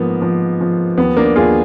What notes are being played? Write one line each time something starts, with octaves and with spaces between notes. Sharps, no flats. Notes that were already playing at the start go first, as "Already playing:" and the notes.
Already playing: G#2 F3 A#3 B3
F3
F3
D#2 B3
A#3 D4
D#2 F4 G#4